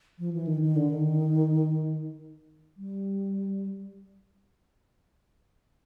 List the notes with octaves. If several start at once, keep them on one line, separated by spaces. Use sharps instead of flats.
F3
E3
D#3
D#3
D3
D#3
G3